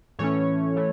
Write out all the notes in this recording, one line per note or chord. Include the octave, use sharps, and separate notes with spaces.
A2 E3 A3 C#4 C#5
E3 A3